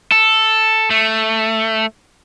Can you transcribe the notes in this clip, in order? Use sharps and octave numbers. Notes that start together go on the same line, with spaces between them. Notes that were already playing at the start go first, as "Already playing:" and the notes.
A4
A3